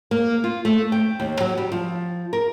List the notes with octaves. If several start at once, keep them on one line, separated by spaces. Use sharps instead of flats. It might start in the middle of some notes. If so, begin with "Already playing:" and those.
A#3
F4
A3
G5
D#2
F#3
G3
F3
A#4